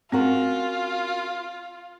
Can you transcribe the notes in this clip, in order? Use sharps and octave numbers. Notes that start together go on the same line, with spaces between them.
C4 C#4 F4 F#4 A#4